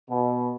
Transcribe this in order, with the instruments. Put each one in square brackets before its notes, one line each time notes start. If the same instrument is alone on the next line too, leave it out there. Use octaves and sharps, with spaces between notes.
[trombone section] B2